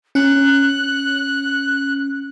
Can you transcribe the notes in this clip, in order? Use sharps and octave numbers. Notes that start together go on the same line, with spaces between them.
C#4 F#6